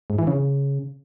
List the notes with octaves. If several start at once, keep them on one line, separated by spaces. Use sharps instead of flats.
G#2
E3
C#3